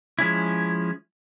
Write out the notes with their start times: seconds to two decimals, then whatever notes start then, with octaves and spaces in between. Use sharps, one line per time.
0.19 F3 G#3 C#4 E4